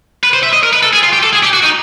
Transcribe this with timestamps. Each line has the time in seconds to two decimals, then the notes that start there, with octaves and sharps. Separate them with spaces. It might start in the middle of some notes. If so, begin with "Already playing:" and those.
0.23 B4
0.33 C5
0.43 E5
0.53 D#5
0.63 A#4
0.73 B4
0.83 A4
0.93 G#4
1.03 F4
1.13 G4
1.23 A4
1.33 G#4
1.43 G4
1.54 F#4
1.63 D#4